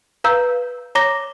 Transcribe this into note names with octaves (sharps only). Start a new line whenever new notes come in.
B4 F5 A#5 E6 G6
C#5 A#5 D6 A#6 G7